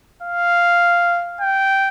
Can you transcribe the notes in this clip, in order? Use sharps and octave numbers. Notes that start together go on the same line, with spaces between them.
F5
G5